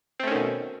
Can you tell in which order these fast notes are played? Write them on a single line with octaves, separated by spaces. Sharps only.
C4 A3 C#4 D#3 B2